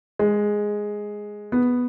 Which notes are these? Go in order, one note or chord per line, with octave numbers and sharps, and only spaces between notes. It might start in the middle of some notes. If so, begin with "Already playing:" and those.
G#3
B3